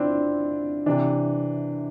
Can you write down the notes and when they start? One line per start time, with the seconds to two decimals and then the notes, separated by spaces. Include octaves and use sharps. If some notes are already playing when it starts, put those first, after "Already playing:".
Already playing: C4 D4 E4 F4
0.86 C3 E3 D4